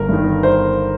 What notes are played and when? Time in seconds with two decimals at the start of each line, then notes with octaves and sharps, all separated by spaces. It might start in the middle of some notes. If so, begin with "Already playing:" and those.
Already playing: G1 A#4
0.09 G2 D#3
0.43 C5